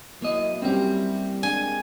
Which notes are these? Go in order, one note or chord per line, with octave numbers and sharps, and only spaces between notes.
F#3 A#3 E4 D#5
G3 A#3 C4 C#4 G4
G#3 A#3 D4 G#5